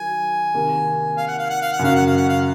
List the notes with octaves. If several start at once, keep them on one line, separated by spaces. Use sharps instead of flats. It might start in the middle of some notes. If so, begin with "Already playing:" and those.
Already playing: D#3 F#3 G#5
C3 D#3 A#3
F5
F#5
F5
F#5
F5
F#5
F#2 C#3 F#3 C#4 F5
F#5
F5
F#5
F5